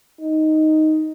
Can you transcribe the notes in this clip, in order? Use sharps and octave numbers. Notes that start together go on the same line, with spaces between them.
D#4